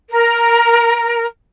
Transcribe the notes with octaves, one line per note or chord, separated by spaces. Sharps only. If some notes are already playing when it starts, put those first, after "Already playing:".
A#4